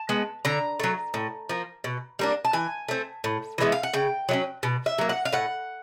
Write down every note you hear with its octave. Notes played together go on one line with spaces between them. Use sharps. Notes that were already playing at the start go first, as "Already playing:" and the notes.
Already playing: A5
G#3 B3
D3 A#5
F#3 A3
A2
F3 A#3
B2
G3 A#3 D4
A5
E3 G#5
A3 C4
A2
E3 G#3 B3 E5
F5
F#5
C#3 G5
F#3 A3 C#4
B2
E5
F#3 A#3
F#5
F5
A2 F#5